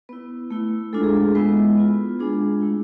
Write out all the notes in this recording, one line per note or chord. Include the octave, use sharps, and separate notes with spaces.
B3 E4 B4
A3 E4
G#3 D4 F4 A4
G#4
A4
G#3 B3 E4 B4
B3 F4
G#3 D4 F4 G#4
A3 E4